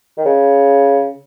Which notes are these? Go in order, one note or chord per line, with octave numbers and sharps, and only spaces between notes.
D#3
C#3